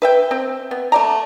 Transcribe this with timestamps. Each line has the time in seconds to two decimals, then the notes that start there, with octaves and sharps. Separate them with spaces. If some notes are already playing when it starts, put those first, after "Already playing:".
0.02 B4 E5 G5
0.31 C4
0.71 B3
0.92 A3 D5 A#5